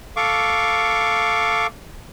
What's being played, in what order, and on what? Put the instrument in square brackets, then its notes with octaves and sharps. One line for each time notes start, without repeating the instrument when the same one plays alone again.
[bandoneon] A4 F5 C#6 D6